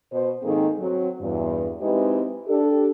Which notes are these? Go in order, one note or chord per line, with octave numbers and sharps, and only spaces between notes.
B2 C5
G#2 D#3 A#3 C4 G#4 A4
F#3 C4
E2 G2
G#3 C4 D#4 E4 G4 B4
D4 G4 A4